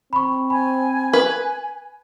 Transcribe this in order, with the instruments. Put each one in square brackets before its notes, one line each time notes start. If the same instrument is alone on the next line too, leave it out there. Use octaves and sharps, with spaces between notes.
[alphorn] C4 [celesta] B5 C#6
[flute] G#5 [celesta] B5
[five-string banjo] B4